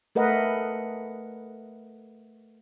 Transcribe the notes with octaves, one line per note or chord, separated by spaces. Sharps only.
A3 A#4 B4 D#5 F#5